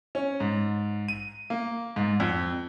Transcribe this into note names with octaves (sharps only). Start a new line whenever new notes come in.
C#4
G#2
D#7
A#3
G#2
F2